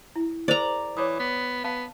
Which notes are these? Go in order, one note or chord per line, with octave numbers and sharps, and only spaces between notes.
E4
G#4 A#4 C5 D5 A#5
E3 C#5 D6 D#6
B3
B3 F5 A5